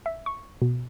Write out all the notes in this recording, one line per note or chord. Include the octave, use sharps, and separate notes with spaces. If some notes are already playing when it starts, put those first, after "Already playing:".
E5
C#6
B2